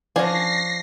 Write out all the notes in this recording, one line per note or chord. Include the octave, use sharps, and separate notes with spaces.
F3 C#4 D4 G#5 A#6 C7